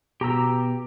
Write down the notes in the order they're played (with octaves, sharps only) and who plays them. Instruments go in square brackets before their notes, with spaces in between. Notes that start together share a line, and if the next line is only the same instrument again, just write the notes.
[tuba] B2 [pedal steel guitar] G4 A#5 E6